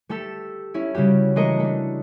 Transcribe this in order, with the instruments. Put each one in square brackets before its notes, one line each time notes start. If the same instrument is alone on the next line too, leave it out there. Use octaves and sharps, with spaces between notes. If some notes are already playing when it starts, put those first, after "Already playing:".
[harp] A3 G4 A4 E6
C#4 E4
C#3 G3 F#4 G4
E3 G#3 A3 A#4 D#5 C#7
A3 D4